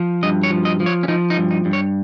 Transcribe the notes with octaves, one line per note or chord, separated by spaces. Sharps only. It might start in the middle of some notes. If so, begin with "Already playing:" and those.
Already playing: F3
G2 D#5
C#5
F3
D#5
F3
C#5
C#4
F3 D#4
D#4
G2
D#4
G2
C#5